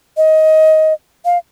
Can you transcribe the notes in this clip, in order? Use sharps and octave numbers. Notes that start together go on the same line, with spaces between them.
D#5
F5